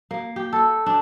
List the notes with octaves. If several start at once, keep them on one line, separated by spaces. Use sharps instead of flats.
A#3
G4
A4
D4